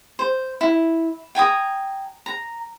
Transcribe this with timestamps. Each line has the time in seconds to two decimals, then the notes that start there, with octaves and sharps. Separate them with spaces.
0.19 C5
0.61 E4
1.35 G5 G#5 A#5 D#6
2.26 A#5